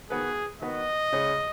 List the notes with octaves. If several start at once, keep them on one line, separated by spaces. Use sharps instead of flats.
D#3 B3 F#4 G#4 B4
D#3 B3 F#4 B4 D#5
C#2 C#3 G#3 C#4 G#4